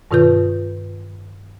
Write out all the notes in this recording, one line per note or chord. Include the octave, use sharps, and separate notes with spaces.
G2 B2 D#3 F4 B4 G6